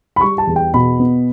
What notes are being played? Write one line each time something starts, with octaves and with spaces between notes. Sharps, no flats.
B5
G3 C#6
A5
E2
G5
B2 B5
B3